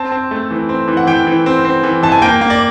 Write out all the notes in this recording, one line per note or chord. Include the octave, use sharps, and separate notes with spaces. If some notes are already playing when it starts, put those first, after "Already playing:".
Already playing: C4 A5
C4
A3
E3
C4
E3
F#5
E3 G5
E3
C4
C4
E3
E3 A5
G#5
A#3 G5
A#3
D5